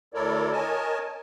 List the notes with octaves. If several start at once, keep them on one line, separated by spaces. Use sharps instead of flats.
D2 E4 A4 A#4 C#5 D5
A#4 C#5 D#5 G#5 A5